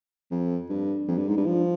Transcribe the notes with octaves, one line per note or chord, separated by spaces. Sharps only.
F2
G2
F2
G2
G#2
G2
F3